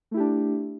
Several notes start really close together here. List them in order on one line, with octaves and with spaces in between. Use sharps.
A3 E4 G4 D4